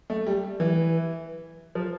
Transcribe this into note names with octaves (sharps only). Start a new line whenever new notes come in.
A3
G3
E3
F3